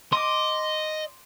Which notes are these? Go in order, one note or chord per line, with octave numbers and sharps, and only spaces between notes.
D#5 C6 D6